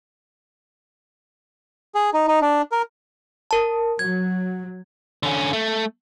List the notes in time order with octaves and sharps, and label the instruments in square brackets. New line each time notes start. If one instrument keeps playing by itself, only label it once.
[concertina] G#4
D#4
D#4
D4
A#4
[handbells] A#4 A5
[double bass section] F#3 [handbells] G#6
[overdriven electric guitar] D3 C#4
A3